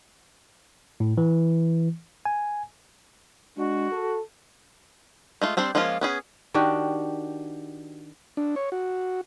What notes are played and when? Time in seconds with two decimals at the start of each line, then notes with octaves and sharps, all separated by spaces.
1.00 A2
1.18 E3
2.25 G#5
3.57 G#3 D4 F#4
3.92 A4
5.42 G#3 A3 F4
5.57 G3 C4 D4 C5
5.75 F3 G#3 A#3 C#4 F4
6.01 B3 C#4 G#4
6.54 D#3 D4 F#4 G4
8.37 D4
8.56 C#5
8.72 F#4